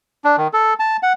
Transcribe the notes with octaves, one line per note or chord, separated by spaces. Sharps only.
D4
D#3
A4
A5
F#5